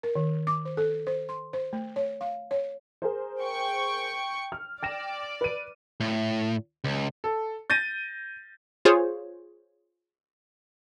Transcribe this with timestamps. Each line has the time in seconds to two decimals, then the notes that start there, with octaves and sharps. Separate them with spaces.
0.03 A#4
0.16 D#3
0.47 D6
0.65 C5
0.77 A4
1.07 C5
1.29 C6
1.53 C5
1.73 A3
1.96 C#5
2.21 F5
2.51 C#5
3.02 G#4 A#4 C5
3.42 G5 C#6
4.52 F6
4.82 D5 G5 A#6 E7
5.41 B4 D#7
6.00 A2
6.84 C#2
7.24 A4
7.70 G6 A6 A#6 D#7
8.85 F4 G#4 C5 C#5